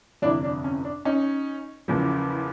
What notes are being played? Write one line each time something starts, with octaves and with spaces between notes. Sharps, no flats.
G1 F2 C3 E3 D4 E4
D4
C#4
D4
C#4 D#4
F#1 E2 C#3 F3